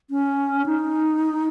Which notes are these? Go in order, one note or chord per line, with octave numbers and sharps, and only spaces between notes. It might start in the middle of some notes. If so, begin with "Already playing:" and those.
C#4
D#4